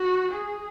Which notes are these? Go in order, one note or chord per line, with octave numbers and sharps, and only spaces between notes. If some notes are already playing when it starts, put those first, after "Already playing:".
Already playing: F#4
G#4